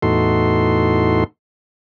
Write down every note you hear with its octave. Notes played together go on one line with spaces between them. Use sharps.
E2 A2 D#4 F#4 A4 C6